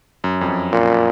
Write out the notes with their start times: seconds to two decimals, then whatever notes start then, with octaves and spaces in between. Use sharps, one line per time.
0.24 F#2
0.41 F2
0.48 F#2
0.72 A#2